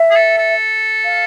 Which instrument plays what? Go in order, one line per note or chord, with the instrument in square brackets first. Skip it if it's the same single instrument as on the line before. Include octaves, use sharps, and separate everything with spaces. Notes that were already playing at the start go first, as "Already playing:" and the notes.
Already playing: [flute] E5
[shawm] G#4
A4
A4
[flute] F5